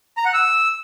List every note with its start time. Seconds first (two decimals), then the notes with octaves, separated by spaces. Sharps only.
0.17 A#5
0.25 F#5
0.34 E6